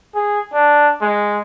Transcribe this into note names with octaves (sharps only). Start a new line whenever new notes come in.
G#4
D4
G#3